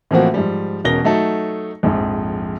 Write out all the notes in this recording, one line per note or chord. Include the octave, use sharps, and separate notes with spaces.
A2 E3 F3 A#3 C4 F#4
G#2 F3 G3
E1 B2 C#4 A#4 A#6 G7
F#3 A3 D#4 A4
A#1 F2 G#2